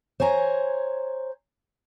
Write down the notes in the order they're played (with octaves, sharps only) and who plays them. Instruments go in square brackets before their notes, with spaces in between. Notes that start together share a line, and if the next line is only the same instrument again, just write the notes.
[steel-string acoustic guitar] C5 C#5 G#5 A#5